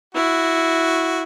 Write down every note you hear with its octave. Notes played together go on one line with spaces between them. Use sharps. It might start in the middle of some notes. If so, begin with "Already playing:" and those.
E4 F#4